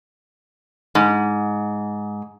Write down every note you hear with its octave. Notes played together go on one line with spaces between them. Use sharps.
G#2